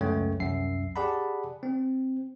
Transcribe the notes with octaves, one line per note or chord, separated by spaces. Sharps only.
C#2 F#2 A3 C#5 G5
C2 F#2 E5 C7
G4 G#4 D5 F#5 A5 B5
C4